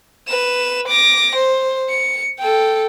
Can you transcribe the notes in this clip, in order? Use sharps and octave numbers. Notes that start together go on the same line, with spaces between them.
B4 E7
D6 A#6
C5
C#7
A4 G5